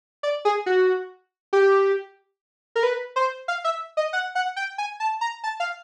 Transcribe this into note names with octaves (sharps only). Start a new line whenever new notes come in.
D5
G#4
F#4
G4
A#4
B4
C5
F5
E5
D#5
F#5
F#5
G5
G#5
A5
A#5
A5
F5